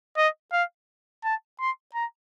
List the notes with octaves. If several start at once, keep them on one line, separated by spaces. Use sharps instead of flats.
D#5
F5
A5
C6
A#5